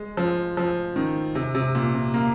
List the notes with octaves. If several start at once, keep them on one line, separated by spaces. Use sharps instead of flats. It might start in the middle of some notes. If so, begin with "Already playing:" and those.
Already playing: G#3
F3
F3
D#3
C3
C3
A#2
C3
A#3